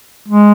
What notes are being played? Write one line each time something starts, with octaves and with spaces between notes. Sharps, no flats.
G#3